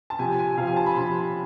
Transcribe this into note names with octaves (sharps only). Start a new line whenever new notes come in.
A5
C3 F3 G#5
G#5
C3 F3 F5
G#5
A5
B5
C3 F3 C6